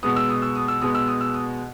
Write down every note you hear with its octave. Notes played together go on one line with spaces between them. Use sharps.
B2 G#3 B3 D#6
E6
D#6
E6
D#6
E6
B2 G#3 B3 D#6
E6
D#6
E6
D#6